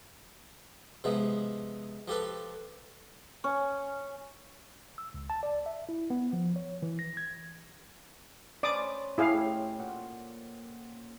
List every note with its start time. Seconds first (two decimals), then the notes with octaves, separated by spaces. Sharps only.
1.04 C3 F3 G#3 B3
2.08 F3 G4 A4 B4
3.44 C#4
4.98 E6
5.14 C#2
5.30 A5
5.43 D5
5.66 E5
5.89 E4
6.10 B3
6.33 F3
6.56 C#5
6.82 E3
6.99 A#6
7.17 G#6
8.63 C#4 B4 C5 D5 D6 D#6
9.18 A2 E4 G4 G#4 F5
9.79 A#2 F#5